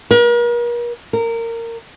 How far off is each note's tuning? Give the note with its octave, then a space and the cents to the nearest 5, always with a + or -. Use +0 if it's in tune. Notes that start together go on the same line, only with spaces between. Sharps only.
A#4 +40
A#4 -20